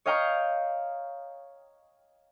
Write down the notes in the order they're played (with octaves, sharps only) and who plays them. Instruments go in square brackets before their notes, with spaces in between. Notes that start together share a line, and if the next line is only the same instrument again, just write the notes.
[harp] C#5 D#5 F5 G5 A#5 C#6